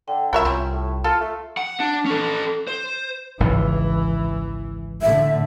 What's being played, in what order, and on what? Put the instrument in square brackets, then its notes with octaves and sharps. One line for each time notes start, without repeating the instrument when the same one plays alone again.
[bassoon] D3 [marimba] G5
[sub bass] C2 [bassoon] C#4 [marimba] F4 B5 [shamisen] F#4 A#4 E5
[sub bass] C2 [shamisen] C4
[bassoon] A2
[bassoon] F4 [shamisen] A4 [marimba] F6
[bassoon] A3
[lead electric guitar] F#5
D4
C#4 A4
C5
[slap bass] G#1 C#2 [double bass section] E3
[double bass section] A2 D3 [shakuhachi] E5